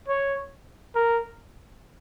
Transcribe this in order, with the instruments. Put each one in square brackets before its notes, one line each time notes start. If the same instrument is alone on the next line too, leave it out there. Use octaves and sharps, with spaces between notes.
[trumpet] C#5
A#4